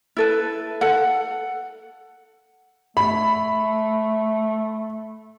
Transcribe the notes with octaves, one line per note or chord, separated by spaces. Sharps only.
E4 A4 B4
A4 F#5
A3 B5